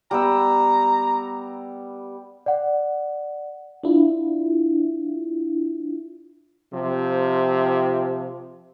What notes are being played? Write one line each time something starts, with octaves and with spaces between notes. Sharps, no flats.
G3 B3 A#5 E6
D5 F#5
D4 E4 F4
C3 F3